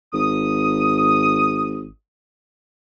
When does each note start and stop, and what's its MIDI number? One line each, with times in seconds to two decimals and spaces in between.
0.13 1.89 32
0.13 1.86 87